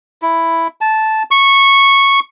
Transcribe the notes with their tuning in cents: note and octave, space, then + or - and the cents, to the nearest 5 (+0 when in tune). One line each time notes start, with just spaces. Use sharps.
E4 +0
A5 -10
C#6 -10